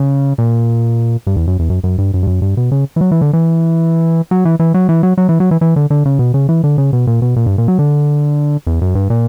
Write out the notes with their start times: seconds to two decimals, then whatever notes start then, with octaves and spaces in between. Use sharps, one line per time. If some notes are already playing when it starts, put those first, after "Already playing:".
Already playing: C#3
0.38 A#2
1.27 G2
1.36 E2
1.47 F#2
1.59 E2
1.70 F#2
1.84 F#2
1.98 G2
2.14 F#2
2.23 G2
2.27 F#2
2.42 G2
2.57 B2
2.71 C#3
2.96 E3
3.01 F#3
3.11 E3
3.21 D3
3.33 E3
4.31 F#3
4.45 E3
4.59 E3
4.74 F#3
4.89 E3
5.03 F#3
5.18 F#3
5.29 E3
5.40 F#3
5.51 E3
5.61 E3
5.76 D3
5.90 D3
6.05 C#3
6.19 B2
6.34 C#3
6.49 E3
6.64 D3
6.78 C#3
6.93 B2
7.07 A#2
7.22 B2
7.36 A#2
7.46 G2
7.58 A#2
7.68 F#3
7.79 D3
8.67 E2
8.81 F#2
8.95 G2
9.10 A#2